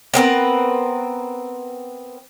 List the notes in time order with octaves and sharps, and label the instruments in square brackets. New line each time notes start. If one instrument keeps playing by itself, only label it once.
[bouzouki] B3 C4 A#4 B4